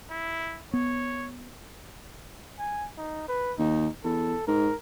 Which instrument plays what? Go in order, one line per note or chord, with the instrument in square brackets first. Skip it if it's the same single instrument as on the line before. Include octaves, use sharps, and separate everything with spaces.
[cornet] E4
[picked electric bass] B3 [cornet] C#5
[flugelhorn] G#5
D#4
B4
[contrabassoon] D#2 [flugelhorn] D#4
[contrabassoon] E2 [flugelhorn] A4
[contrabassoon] G#2 [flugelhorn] A#4